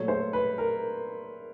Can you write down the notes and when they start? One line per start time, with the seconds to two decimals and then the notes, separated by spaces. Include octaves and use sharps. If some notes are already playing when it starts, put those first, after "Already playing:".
Already playing: A#2 F#3 A3 C#5
0.08 C5
0.33 B4
0.58 A#4